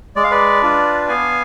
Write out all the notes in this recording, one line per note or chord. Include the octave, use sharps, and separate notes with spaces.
G#3 D5
F5
B4 D5
D4 F4
B3 F5 G#5